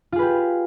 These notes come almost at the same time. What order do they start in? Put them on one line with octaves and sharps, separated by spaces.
F4 G#4 B4 G4